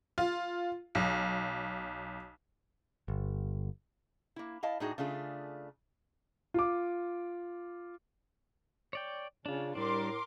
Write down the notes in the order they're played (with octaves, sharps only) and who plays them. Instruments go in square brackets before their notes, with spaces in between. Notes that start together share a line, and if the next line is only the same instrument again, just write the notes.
[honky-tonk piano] F4
B1
[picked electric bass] G1
[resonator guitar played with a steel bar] A#3 E4
E4 D#5 F5 A5
A2 D4 D#4 F#4 G#4
C#3 A3 D4 F4 G#4
[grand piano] F4 D6
[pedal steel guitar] C#5 D5 G5
[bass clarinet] C#3 [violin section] C#4 [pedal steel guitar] D4 F4
[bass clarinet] A2 [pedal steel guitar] G3 D4 [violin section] A#4 C6 D6